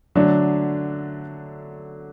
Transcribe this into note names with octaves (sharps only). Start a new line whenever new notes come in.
D3 F#3 A3 D4